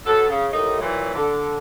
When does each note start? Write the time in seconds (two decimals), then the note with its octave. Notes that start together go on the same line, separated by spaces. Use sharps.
0.05 F#3 B3 A4
0.28 C#3
0.51 D#2 A2 A#3 D#4
0.79 A#2 E3 F#3
1.14 D3